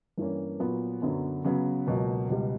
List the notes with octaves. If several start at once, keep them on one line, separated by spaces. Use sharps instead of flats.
G2 E3 A#3 C#4
A#2 F#3 B3
F#2 D3 F#3 B3
C#3 F#3 B3
C#2 B2 F#3 A#3
C#2 B2 G3